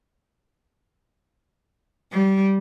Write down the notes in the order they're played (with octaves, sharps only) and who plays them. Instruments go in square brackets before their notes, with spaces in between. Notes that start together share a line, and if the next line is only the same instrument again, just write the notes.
[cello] G3